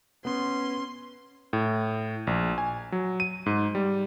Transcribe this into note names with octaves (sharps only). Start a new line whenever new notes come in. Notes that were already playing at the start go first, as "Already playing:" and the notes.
B3 C#4 C6
A2
A#1
G#5
F#3
D#7
G#2
G3